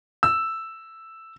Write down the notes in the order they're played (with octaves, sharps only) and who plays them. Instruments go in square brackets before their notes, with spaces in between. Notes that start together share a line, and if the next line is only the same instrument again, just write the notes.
[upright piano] E6